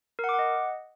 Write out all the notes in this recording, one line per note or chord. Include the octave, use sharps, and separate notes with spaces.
A#4
F#5
D6
F#5
D#5